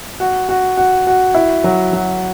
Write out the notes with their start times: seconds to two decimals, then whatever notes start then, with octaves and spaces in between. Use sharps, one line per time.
0.20 F#4
0.49 F#4
0.77 F#4
1.07 F#4
1.34 E4
1.64 F#3
1.93 F#3